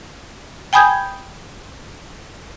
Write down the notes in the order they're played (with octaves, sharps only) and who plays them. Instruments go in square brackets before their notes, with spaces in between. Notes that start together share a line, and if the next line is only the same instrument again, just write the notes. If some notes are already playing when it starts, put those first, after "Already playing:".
[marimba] G5 G#5 B5 D#6 G6 G#6